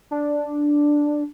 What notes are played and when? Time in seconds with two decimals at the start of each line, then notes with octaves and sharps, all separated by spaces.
0.11 D4